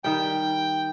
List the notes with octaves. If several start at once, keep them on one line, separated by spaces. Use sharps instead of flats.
D#3 G3 G5